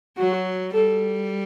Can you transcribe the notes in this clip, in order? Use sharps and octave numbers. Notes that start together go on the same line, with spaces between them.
F#3 F#4
G3 A4